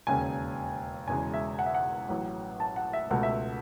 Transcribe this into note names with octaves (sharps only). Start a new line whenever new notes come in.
E1 D#2 C#3 G#5
E1 E2 C#3 G#3 G#5
E5
F#5
E5
F#5
A1 A2 F#3
A5
F#5
E5
C#2 B2 A3 F#5
E5